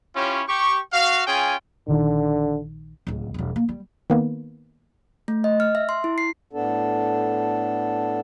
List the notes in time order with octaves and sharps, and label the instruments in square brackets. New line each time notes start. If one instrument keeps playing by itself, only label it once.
[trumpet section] C#4 E4 F4 G4 C#5
G4 C#6
F#4 F5
C#4 F4 G#4 G5 G#5
[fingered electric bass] A#1 D#3 [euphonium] D3
[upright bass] D1 C#2
E1 G3
A#3
G3
[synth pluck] D#3 A#3 B3
[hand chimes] A3
D#5
F6
E5
C6
E4
C7
[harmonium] A2 B3 D4 A4